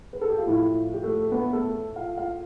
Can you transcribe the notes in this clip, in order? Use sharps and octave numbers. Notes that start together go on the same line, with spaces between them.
B4
A4
G4
F4
A2 F3 E4
G4
A3 A4
B3 B4
A3 A4
F4 F5
F4 F5